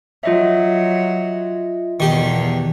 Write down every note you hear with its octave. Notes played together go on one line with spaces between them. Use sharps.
F#3 F4 D#5 E5
E2 B2 D#3 G4